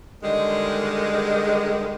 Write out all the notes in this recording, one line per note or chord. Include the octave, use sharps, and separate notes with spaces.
D3 D#3 G3 G#3